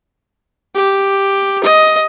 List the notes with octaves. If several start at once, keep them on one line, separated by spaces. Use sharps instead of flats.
G4
D#5